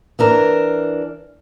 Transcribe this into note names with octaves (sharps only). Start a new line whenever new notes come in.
E3 D4 A#4